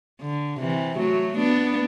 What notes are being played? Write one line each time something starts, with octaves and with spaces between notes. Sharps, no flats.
D3
C3 E3
F#3 A3
B3 D4